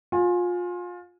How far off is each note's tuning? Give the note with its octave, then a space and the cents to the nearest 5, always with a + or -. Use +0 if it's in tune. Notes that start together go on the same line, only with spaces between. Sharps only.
F4 +25 G#5 +0